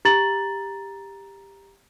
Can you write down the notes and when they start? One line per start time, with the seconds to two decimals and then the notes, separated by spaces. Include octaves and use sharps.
0.05 G4 A#5 A6 F#7